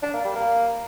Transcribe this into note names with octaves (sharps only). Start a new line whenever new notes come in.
D4
A#3
G3
A#3